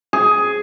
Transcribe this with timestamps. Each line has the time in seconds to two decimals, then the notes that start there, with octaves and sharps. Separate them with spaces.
0.13 G#4